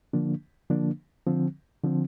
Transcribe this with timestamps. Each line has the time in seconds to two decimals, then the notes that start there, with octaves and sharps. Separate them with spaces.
0.13 D3 F3 A#3 D4
0.70 D3 F3 A#3 D4
1.27 D3 F3 C4
1.84 D3 F3 C4